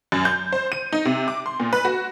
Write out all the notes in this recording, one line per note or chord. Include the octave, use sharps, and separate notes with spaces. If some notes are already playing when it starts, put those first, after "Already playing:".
F#2
G6
C5
D#7
D#4
C3
D6
C6
A#2
B4
F#4